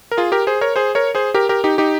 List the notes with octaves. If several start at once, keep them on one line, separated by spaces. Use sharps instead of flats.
A#4
F4 G#4
G4 A#4
G#4 C5
A#4 C#5
G#4 C5
A#4 C#5
G#4 C5
G4 A#4
G4 A#4
D#4 G4
D#4 G4